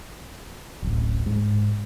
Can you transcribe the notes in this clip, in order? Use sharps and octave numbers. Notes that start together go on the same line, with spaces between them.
D1 A1
G#2